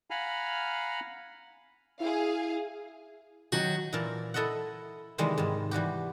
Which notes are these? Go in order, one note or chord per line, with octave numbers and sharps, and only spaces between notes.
F5 F#5 G#5 A#5 B5 F6
E4 G#4 F5
D#3 F#3 F#4
A#2 E3 E4 A#4 A5
E4 A4 D#5 E5 F#5
C3 D#3 E3 G3 G#3
G#2 D#3
E3 G3 F#4 G4